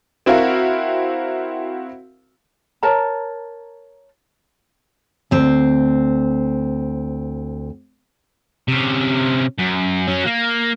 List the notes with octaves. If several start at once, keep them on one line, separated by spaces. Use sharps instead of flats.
C4 E4 F#4 A#4 F5
A#4 C#5 A5 A#5
D2 C4
C3 C#4
F#2
F#3 C#4
A#3